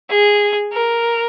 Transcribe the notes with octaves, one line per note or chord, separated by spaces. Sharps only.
G#4
A#4